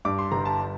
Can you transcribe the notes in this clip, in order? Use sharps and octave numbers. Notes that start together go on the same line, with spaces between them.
G2 D6
C6
G1 A#5
A5